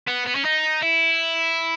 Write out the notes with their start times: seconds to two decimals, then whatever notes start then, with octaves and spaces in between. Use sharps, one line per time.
0.08 B3
0.27 B3
0.36 C#4
0.45 D#4
0.82 E4